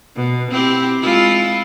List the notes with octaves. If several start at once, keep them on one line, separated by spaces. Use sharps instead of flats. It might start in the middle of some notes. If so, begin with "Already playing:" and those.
B2
C4 E4 G4
G#3 E4 F4